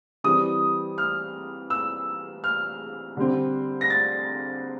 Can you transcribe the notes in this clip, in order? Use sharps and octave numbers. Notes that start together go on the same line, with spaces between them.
E3 G3 C4 D#6
F6
E6
F6
D3 G3 C4
A#6
A6